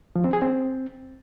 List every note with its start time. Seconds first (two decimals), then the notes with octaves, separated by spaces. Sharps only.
0.16 F3
0.24 C4
0.33 G#4
0.42 C4